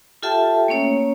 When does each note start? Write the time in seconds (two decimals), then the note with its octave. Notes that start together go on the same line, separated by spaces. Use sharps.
0.23 F4 G4 A4 E5 G5 A5
0.68 A3 A#3 C#4 C#5